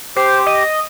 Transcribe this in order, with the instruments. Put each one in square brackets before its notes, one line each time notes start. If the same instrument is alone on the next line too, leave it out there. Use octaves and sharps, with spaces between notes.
[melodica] G4 [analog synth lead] C5
[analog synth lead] D#5